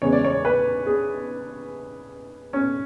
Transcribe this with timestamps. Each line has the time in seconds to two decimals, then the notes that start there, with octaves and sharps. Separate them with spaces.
0.02 E2 C#3 G#3 C#5
0.12 D5
0.25 C#5
0.45 B4
0.87 G#4
2.53 C#4